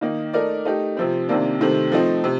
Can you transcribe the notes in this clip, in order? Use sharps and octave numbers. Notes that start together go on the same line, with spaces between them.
D#3 A#3 D#4
A3 D#4 A#4 D5
A3 D#4 G4
C3 F3 C4
C3 D#3 A#3 D4
C3 D#3 A3 C4
F3 A3 C4 D#4
C3